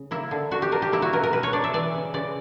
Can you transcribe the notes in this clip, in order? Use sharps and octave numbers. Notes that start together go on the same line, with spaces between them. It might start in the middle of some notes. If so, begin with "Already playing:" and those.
Already playing: C#3
A#3 E4
D3
D3 F#4
G4
D4 A#4
G4
A#3 E4
F#4
B2 A#4
A#4
B2 B4
C#5
D4 D5
E5
E3 D5
C#3
C#3 D5